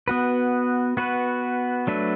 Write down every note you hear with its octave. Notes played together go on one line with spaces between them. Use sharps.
B3 F#4 B4
B3 F#4 B4
F#3 A3 D4 B4